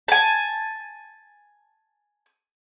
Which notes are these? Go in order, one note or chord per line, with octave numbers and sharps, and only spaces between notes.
G#5 A5